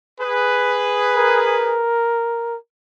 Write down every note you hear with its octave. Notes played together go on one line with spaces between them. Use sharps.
G#4 B4
A#4